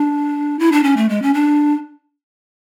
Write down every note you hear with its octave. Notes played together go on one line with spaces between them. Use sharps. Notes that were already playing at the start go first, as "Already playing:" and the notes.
Already playing: D4
E4
D4
C#4
A3
G#3
C#4
D4